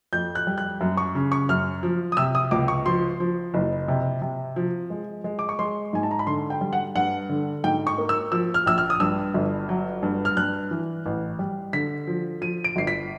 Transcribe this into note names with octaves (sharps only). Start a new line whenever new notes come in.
F2 G6
F#6
G3
F#6
F#2
C#6
C#3
C#6
F#2 F6
F3
D#6
C3 E6
D#6
C#2 D6
C#6
F3 C6
F3
F#1
C3
C3
F3
G#3
G#3
D6
C#6
G#3 C6
G#2 G#5
A5
A#5
B5
D3 C6
G5
G3
F#5
G2 F#5
D3
G#2 G5
C#6
A#3
E6
F3 E6
F6
A#1 E6
F6
D#6
G2 E6
G1
F#3
G2
F6
G2 F#6
E3
A1
G3
D3 B6
F3
F3 D#7
D7
G1 C7
B6